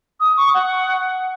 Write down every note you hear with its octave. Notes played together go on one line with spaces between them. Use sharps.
D#6
C#6
F#5